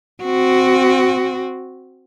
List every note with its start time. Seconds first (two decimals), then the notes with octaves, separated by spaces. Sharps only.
0.23 C4 F#4